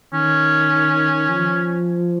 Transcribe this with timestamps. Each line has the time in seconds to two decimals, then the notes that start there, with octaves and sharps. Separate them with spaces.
0.13 D#3 C#4
1.30 F3